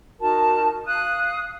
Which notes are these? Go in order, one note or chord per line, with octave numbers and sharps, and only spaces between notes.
D#4 F#4 A#4 A5
F5 D#6 F#6